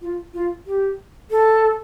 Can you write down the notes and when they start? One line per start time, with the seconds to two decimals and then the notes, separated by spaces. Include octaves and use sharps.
0.02 F4
0.34 F4
0.66 G4
1.31 A4